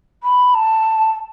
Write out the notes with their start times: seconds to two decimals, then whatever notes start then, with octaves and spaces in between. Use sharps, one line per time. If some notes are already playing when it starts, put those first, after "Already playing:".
0.23 B5
0.55 A5